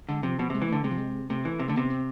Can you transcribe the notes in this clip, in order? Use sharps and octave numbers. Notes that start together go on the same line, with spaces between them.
D3 G#3
C3 F3
B2 F3
C3 G#3
E3
D3 A3
C3 G#3
F3
G#3
C3 A3
E3
C3
D3 A3
C3 B3
C4